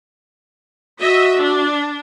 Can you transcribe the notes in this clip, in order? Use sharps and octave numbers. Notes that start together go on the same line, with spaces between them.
F#4 D#5 E5
D4